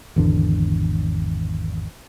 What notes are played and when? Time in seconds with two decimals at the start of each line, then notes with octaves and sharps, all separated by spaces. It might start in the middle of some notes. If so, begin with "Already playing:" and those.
0.16 G#1 E2 D3